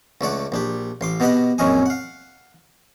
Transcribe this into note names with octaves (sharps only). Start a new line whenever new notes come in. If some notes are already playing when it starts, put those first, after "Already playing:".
C#2 A3 D5 F#5
A#1 D4 G4
A1 C6 D6
B2 B3 G4 D#5 F#5 B5
A#1 F#2 C4 C#4 D#5 G#5
F5 F#5